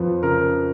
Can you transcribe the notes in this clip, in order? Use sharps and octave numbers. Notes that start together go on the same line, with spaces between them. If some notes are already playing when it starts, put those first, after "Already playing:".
Already playing: F2 F3 B4
C#3 A#4